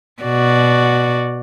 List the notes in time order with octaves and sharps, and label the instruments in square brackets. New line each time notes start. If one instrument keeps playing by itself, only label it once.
[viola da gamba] B2 F#4 D5